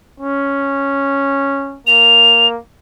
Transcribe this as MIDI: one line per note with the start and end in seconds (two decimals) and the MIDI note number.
0.20 1.78 61
1.87 2.58 58
1.87 2.47 101